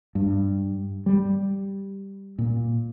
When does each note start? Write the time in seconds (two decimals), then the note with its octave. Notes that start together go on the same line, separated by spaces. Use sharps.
0.15 G2
1.06 G3
2.38 A#2